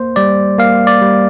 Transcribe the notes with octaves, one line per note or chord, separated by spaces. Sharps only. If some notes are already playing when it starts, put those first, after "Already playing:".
Already playing: A#3 C5
G3 D5
A#3 F5
D5
G3